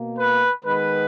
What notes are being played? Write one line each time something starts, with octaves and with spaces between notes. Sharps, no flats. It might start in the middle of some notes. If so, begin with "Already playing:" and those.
Already playing: B2 A#3
B4
D#3 G#3 B3 B4